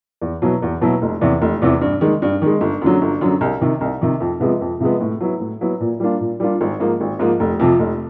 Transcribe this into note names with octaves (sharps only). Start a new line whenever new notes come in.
E2
B2 F#3 B3 E4
E2
B2 F#3 B3 E4
F1
E2 C3 E3
F1
E2 C3 E3
G2
D#3 G#3
G2
D#3 G#3
G1
F#2 D3 F#3
G1
F#2 D3 F#3
C2
C3 D#3
C2
C3 D#3
F2
C3 F3 G#3 B3
F2
C3 F3 G#3 B3
A2
F#3 B3 E4
A2
F#3 B3 E4
A#2
G3 A#3 D4 F4
A#2
G3 A#3 D4 F4
G#1
G#2 F3 A#3
G#1
G#2 F3 A#3
F1
F2 C3 F3
F1